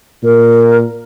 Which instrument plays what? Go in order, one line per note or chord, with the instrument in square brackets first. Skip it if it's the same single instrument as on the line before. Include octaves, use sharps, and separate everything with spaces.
[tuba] A#2 [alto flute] A#4